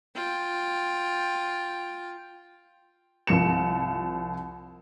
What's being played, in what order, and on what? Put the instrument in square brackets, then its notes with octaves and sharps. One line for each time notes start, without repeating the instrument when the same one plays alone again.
[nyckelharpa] F4 G5
[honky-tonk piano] C2 F3 C#7 E7